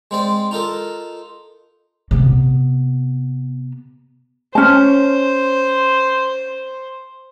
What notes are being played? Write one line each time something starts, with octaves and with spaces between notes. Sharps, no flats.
G#3 C4 D5
D#4 F4 A4 A#4
C3 B3
C#4 C5 A5